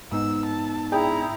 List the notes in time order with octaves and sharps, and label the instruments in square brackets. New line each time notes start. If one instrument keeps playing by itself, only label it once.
[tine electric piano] G#2 B3 D#4 [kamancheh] E6
[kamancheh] A5
[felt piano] D4 G#4 G5 [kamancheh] E4 A#5